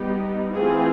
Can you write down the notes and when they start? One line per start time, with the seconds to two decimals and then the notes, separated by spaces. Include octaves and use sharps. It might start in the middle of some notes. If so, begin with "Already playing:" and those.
Already playing: G3 B3 D#4 G4
0.53 E3 A3 C4 F4 G#4